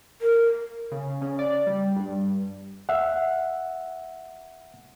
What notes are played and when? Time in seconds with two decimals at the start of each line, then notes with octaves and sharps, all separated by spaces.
0.22 A#4
0.92 C#3
1.21 C#3
1.39 D5
1.67 G3
1.96 G2
2.89 E5 F#5